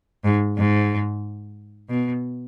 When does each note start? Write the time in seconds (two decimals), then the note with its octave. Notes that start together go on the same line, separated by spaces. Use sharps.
0.24 G#2
0.57 G#2
1.89 B2